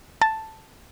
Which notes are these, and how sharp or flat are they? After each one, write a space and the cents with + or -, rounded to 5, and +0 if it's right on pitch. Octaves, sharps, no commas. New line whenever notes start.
A5 +5